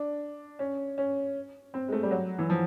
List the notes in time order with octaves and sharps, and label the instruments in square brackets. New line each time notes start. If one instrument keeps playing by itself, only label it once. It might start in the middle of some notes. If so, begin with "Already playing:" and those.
Already playing: [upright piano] D4
C#4
C#4
C4
G#3
A3
G3
F#3
E3
F3